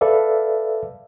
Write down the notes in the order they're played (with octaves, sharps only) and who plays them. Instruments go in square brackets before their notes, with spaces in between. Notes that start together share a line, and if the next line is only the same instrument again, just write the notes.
[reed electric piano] A4 B4 D5 E5 F5